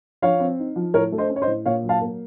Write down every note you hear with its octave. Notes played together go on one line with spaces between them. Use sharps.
F3 C#5 F5
C4
D#4
F3
A2 A#4 C#5
A3
C5 D#5
C#4
C#5
C5 D#5
A2
A#2 C#5 F5
F#3
F5 A5
A#3